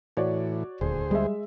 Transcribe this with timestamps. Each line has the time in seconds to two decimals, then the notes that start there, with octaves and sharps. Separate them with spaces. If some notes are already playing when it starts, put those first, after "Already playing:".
0.17 A2 E3 F#4 C#5 D5
0.81 D#1 D2 G#4 C5
1.11 G3 G#3 E5